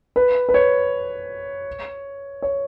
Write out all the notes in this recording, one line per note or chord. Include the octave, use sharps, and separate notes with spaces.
B4
B4
C#5
C#5